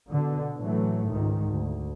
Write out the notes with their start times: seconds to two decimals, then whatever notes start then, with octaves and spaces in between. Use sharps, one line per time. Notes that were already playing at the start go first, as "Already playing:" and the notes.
0.10 B2 D3
0.61 A2 E3 F#3 A3
1.09 C#2 G#2 D#3
1.48 D2